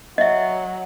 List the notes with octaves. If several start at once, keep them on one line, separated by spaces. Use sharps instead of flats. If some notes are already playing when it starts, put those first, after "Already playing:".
F#3 D#5 E5